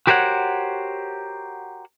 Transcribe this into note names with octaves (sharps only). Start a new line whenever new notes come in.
F#4 G4 A#4 C5 C#5 F#5